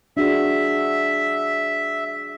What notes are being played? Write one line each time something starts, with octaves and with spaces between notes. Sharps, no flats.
D4 F#4 G#4 E5